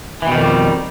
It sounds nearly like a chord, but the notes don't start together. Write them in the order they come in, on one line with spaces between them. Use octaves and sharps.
E3 B2 D#3 F2 G3